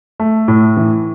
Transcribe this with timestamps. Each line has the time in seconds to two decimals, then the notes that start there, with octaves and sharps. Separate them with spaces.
0.20 A3
0.48 A2
0.77 E3